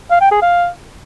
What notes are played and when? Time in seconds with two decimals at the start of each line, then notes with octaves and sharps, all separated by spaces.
0.10 F5
0.21 G5
0.31 G#4
0.42 F5